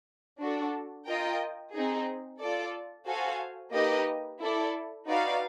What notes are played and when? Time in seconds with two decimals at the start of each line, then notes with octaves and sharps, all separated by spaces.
0.40 D4 F#4 A4
1.07 F4 A#4 D#5 G5
1.74 C4 D#4 G#4
2.40 F4 A4 D5
3.06 F#4 A4 C5 F5 G#5
3.73 A#3 D#4 G4 B4 D#5
4.40 E4 A4 D5
5.06 D#4 F#4 B4 D5 F5